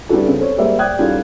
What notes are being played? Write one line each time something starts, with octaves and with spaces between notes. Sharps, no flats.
G3 B3 D4 E4 F#4 A4
C#3 C4
A4 C5 C#5
G3 G#3 A#3 C5 E5
D5 G5 D#6 F#6 G#6
E2 G3 C#4 D#4 F4 A4